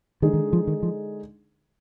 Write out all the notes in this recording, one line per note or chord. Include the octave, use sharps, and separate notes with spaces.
D3 D#3 G#3 D#4 G#4
D#3
F3
D#3
F3